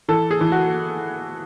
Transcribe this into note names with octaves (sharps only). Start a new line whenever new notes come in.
E3 A4
G#4
E3
F#4